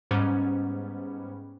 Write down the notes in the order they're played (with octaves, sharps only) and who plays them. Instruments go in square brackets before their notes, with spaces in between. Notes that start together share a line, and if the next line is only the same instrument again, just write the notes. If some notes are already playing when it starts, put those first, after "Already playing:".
[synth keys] G#2 G3 B3 C#4